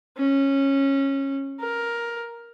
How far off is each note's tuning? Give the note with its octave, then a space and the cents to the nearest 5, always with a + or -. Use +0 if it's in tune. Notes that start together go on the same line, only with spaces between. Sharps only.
C#4 -15
A#4 +10